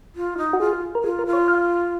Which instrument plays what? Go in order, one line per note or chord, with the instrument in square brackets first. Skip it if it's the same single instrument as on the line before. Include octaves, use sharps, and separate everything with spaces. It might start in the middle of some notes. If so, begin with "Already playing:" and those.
[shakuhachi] F4
D#4
[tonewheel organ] F#4
[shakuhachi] F4 [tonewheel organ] G#4
[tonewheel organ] A#4
[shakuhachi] F4 [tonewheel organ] G#4
[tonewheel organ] A#4
[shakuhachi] F4
[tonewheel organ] C#5
F5